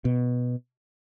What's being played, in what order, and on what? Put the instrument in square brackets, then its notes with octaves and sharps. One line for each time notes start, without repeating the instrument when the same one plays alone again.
[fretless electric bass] B2